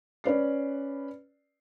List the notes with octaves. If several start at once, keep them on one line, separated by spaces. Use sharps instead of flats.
C#4 B4 D5 C7